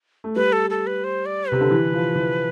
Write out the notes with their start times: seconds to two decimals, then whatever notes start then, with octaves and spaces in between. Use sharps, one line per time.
0.24 A3
0.36 G3 B4
0.52 A4
0.70 A4
0.87 B4
1.04 C5
1.26 D5
1.49 C3 B4
1.61 D3
1.71 E3
1.93 F3
2.16 E3